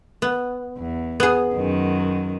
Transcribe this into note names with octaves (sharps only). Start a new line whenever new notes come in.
B3
E2
B3 G#4
F#2 D#3